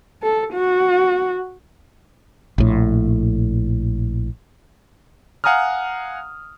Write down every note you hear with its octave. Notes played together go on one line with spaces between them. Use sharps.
A4
F#4
A#1 A2
F5 F#5 G#5 A#5 D#6 F6